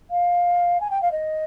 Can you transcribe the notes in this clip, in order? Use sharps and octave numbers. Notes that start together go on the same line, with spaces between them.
F5
G#5
G5
F5
D#5